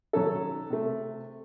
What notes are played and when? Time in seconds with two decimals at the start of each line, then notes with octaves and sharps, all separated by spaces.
0.13 D#3 F#3 C#4 A4
0.70 C3 A3